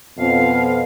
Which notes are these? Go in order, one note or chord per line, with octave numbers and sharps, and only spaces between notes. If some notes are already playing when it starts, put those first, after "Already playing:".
F2 B2 F5